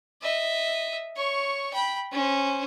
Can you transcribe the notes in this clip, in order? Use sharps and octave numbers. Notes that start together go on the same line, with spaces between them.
D#5 E5
C#5 C#6
G5 B5
C#4 C5